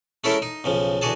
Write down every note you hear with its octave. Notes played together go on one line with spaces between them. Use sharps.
G#3 A3 C#4 E4 A4 A#4
D#4
B1 C#3 F3
E2 D3 F#4 G#4 A5